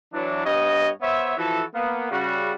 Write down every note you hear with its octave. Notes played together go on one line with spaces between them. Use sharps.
E3 F#3 D4
G2 B3 C#5 D#5
B3 C5 C#5 E5
E3 F3 E4 F#4 A4
A#3 B3
C#3 G3 F#4